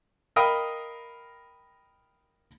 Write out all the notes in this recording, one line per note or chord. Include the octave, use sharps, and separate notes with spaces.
A#4 D#5 F5 G5 B5 D#6